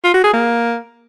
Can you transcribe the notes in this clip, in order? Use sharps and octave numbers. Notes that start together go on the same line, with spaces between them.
F4
F#4
G#4
A#3